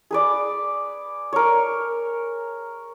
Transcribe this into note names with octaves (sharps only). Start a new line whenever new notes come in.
G#4 B4 D5
A#4 C#5